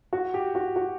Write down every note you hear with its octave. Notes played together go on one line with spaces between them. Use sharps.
F#4
G4
F#4
F#4